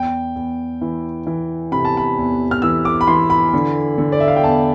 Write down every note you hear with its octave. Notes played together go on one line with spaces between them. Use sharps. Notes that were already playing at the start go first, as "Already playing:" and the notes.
Already playing: E2 G5
E2
E3
E3
C3 B5
A5
B5
E2
F6
E3 E6
D6
B5
E3 C6
B5
D3
D3
D5
E5
F5
G5
E2 A5